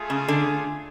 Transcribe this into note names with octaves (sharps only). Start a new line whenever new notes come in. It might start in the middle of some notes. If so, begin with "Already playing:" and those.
Already playing: A3 F4 G#4
C#3
D3